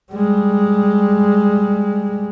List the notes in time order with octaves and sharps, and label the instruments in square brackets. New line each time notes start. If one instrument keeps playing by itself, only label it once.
[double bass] G3 G#3